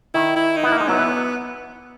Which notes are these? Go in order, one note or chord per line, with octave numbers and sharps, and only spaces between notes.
D#3 E4
E4
D#4
B3 E4
A#3
G#3 D#4
F#3 B3
E3